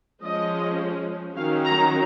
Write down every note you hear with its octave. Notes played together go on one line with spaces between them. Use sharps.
F3 G#3 C#4 D#5
D#3 F#3 C#4 F5
A#5